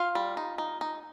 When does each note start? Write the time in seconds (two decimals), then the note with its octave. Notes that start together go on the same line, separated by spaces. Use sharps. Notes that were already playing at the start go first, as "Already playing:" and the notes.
Already playing: F4 F5
0.15 G3
0.37 D#4
0.58 D#4
0.81 D#4